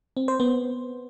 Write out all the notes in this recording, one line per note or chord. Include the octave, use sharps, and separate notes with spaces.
C4
C5
B3